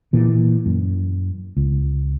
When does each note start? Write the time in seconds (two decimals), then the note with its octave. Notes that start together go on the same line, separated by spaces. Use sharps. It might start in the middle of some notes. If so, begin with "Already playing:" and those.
0.13 A#2 E3
0.66 F#2
1.57 C#2